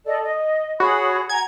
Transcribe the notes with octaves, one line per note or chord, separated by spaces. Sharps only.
A4 D5 D#5
D#5
F#4 G#4 C#5 B5
F#5 G#5 A#5 G#6